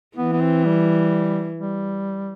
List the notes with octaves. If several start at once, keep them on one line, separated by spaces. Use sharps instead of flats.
E3 B3
B3
C4
G3
G3